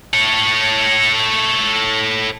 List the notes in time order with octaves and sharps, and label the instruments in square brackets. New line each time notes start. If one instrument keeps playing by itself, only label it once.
[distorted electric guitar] A4 C#5